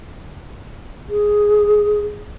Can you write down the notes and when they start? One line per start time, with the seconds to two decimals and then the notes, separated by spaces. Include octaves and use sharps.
1.09 G#4